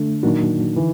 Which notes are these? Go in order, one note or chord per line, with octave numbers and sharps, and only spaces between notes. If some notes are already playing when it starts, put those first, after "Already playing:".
Already playing: D3 A3
A#2 D#3 F#3 A#3 D4 F#4
D3 E3